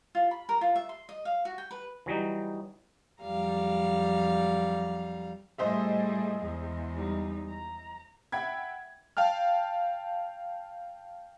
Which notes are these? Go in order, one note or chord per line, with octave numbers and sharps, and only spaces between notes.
F4
B5
A#4
F4
E5
C6
D#5
F5
F#4
G5
B4
E3 F#3 G3 D#4
F2 F#3 G3 F5 A#5
A2 G3 G#4 C5 D#5 E5
E2 G#3
G3 D#4
A#5
E5 F#5 G5 B5 G#6
F5 G5 A5 F6